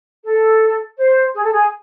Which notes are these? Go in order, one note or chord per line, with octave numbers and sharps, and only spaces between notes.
A4
C5
G#4
A4
G#4